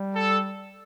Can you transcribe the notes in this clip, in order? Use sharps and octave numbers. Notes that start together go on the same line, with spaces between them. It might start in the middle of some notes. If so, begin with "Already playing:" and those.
Already playing: G3
A4